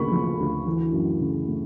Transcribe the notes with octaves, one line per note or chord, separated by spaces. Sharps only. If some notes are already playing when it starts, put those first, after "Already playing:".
Already playing: D2 C#3 A#3 B5 C#6
F3
D2
E3
F#2
C#3
A3